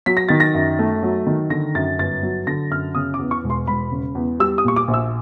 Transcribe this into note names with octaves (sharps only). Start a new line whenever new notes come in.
F#3 B6
A#6
D#3 A6
A#6
F#2
A3
F#3
D#3
D3 A#6
F#2 A6
G1 A6
F#3
D3 A#6
F#2 F6
C#3 D#6
D6
E2
C#6
E1
C6
E1 B5
C#3
E2
G3 E6
D#6
A#2 C#6
D6
A#1
E6